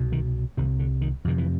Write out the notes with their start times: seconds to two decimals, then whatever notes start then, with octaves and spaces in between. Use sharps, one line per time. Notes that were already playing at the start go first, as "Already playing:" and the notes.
Already playing: C2 B2
0.12 D#3
0.57 C2 C3 D#3
0.79 D3
1.01 D#3
1.25 F2 C3 D#3
1.38 E3